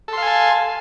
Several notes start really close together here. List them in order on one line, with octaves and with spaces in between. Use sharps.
A4 C6 F5 G#5 A5